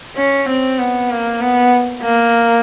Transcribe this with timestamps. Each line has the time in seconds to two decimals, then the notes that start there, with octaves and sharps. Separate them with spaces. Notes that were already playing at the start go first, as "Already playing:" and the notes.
0.16 C#4
0.49 C4
0.79 B3
1.10 A#3
1.41 B3
2.03 A#3